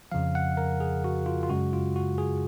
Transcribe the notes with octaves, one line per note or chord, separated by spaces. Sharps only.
F2 C#3 F3 F5
F#5
A#4
G#4
F#4
F4
F4
F#2 C#3 G#3 F#4
F4
F#4
G#4